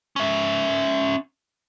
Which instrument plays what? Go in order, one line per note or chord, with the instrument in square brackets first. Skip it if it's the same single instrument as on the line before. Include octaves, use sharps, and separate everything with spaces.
[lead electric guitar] C#4 E5